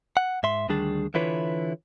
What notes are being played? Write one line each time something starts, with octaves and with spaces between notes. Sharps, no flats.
F#5
G#2 E5 C6
D2 D#3 G3 D4 G#4 A5
D3 E3 E4 F4 B4 C#5